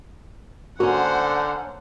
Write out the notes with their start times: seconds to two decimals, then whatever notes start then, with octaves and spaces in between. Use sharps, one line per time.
0.80 D3 A#3 C#4 F#4 C5 F#5